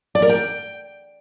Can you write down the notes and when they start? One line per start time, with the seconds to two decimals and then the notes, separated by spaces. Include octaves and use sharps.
0.15 D5
0.22 A#4
0.29 G5